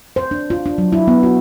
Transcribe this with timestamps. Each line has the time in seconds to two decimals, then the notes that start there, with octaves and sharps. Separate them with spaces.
0.16 C5
0.31 D4
0.50 F4
0.66 D4
0.78 F#3
0.93 E4
1.08 B3
1.23 F#4